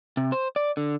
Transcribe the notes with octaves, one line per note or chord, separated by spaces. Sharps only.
C3
C5
D5
D3